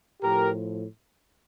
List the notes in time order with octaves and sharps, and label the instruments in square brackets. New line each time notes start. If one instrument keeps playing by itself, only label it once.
[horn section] A2 F3 G4 A#4